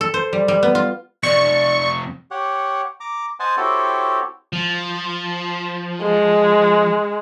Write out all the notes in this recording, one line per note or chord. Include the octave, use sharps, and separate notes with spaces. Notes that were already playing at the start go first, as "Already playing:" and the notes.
A4
C5
G3
G3
B3
F4
F2 C3 D5 C#6
G4 C#5 F#5
A#5 D6
C5 D#5 F#5 G#5 A5 C6
C4 E4 F#4 G4 A4 C#5
F3
G#3